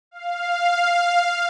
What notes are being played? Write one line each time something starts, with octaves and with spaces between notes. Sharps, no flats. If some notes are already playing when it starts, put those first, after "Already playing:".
F5